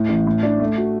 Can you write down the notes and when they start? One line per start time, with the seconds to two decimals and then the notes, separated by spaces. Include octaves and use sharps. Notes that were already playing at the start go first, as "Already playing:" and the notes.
Already playing: A2
0.09 A1
0.27 A2
0.43 D4
0.60 A3
0.77 F#4